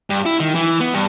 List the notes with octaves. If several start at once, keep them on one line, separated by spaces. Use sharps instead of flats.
G2
E4
D#3
E3
B3
G2